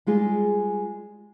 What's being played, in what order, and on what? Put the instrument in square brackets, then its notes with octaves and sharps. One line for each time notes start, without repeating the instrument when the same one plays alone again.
[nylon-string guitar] G3 G#3 F4 G#4